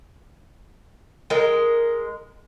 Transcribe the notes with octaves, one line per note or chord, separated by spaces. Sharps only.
G#3 A#4